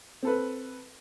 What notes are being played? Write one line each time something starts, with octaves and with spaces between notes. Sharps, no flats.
C4 A4 B4